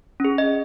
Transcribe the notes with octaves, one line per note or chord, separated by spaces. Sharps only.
C#4 G#4
D#5